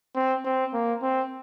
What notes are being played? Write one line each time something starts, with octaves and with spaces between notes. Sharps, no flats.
C4
C4
A#3
C4